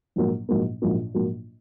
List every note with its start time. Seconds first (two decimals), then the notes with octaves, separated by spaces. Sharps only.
0.16 A#1 G#2 F#3 A#3
0.49 A#1 G#2 F#3 A#3
0.82 A#1 G#2 F#3 A#3
1.14 A#1 G#2 F#3 A#3